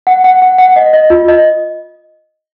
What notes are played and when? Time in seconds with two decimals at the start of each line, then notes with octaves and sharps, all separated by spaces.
0.07 F#5
0.24 F#5
0.42 F#5
0.58 F#5
0.76 D#5
0.93 D#5
1.10 F4
1.28 D#5